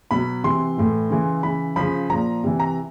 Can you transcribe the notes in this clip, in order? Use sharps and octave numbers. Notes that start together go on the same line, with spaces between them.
B2 F#3 B5
C3 E3 C6
A2 E3
C#3 E3
C#3 E3 B5
C#3 F3 B5
A#2 F3 A#5
C3 E3
A#5